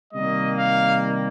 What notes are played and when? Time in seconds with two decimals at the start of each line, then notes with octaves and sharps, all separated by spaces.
0.13 C3 D#3 G3 A#3 D#5
0.58 F5